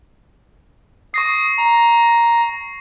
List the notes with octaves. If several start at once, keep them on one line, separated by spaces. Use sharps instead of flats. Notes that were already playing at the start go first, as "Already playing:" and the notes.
C#6 D#6 A#6 C7
A#5